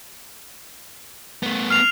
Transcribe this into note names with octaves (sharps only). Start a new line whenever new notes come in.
A3 B3
F6 C7 F7